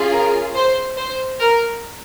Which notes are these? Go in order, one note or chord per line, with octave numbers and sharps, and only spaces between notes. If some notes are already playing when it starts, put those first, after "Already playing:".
Already playing: C#4 F4 G#4
A#4
C5
C5
A#4